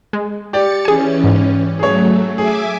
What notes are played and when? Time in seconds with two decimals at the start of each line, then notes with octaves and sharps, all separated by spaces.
0.13 G#3
0.53 G4 D5 A6 C#7
0.85 E3 C#4 G#4 G#5
1.24 G#2
1.79 F#3 A3 G#4 C#5
2.38 G#4 E5 G#5 D6